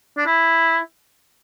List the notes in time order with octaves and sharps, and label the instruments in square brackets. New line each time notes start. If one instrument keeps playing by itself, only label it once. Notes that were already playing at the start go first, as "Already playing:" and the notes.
[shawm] D4
E4